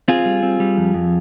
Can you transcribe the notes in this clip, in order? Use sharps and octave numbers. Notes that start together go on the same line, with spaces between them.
C4 F4 G#4
G3
C4
G3
F2
F2